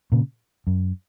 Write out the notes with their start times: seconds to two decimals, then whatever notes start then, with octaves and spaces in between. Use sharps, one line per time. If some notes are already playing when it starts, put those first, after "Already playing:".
0.12 A#2 C#3
0.67 F#2